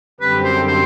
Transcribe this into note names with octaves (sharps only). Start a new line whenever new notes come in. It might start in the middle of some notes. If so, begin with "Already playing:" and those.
F#2 D3 G3 C4 G4 B4
C5
C5